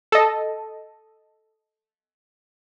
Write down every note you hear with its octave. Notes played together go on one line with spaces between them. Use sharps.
A4 D#5